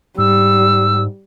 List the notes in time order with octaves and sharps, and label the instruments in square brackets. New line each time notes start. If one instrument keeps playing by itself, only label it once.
[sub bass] G#2 [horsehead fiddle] G3 [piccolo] E6